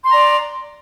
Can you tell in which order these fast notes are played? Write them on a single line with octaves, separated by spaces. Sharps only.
C6 A#5 D5